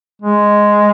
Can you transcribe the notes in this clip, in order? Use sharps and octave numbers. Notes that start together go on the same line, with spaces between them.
G#3